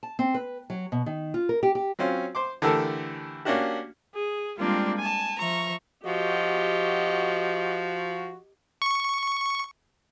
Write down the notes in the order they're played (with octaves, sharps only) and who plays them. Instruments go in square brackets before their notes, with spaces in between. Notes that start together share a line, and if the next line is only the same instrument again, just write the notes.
[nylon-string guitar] A5
C4
B4
F#3
B2
D#3
F4
A#4
G4
G4
[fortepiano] F#3 C4 C#4 F4
C5 C6 D6
D3 E3 A3 G4 A4 A#4
A#3 C#4 D4 F#4 G4
[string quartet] G#4
G3 G#3 A#3 C4 D4 F4
G#5 A5
F3 E5 A#5 C#6
[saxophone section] F3 F#4 [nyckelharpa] G4 D#5
[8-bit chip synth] C#6